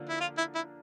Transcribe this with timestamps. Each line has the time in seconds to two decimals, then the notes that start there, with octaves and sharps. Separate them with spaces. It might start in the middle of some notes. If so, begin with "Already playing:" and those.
Already playing: D3 F3 A#3 D4
0.09 E4
0.20 F4
0.37 E4
0.55 E4